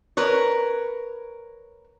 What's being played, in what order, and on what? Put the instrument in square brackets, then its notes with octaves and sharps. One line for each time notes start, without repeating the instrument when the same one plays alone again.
[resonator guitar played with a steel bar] A#4 B4 C#5